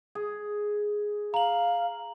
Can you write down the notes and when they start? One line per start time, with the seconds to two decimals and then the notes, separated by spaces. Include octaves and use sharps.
0.15 G#4
1.34 F5 A#5 F#7